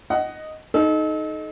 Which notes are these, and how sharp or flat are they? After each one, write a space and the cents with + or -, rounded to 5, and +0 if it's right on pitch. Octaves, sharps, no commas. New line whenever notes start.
D#5 +0 F#5 +20
D#4 +0 A4 -35